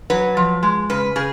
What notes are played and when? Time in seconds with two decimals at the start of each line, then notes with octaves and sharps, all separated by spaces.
0.10 F#3 B4
0.37 F3
0.63 G#3
0.90 C#3 B4
1.16 C#3 G#4